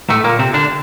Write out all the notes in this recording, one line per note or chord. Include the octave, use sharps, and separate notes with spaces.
A2 A3
A#2 A#3
C3 C4
D3 D4